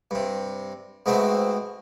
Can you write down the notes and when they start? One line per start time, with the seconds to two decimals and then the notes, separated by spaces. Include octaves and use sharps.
0.11 G2 C3
1.06 G#2 B2 A3 C4